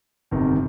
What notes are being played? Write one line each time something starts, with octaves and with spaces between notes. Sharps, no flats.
G1 F2 C3 D#3